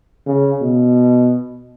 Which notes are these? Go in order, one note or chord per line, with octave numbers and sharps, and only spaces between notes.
C#3
B2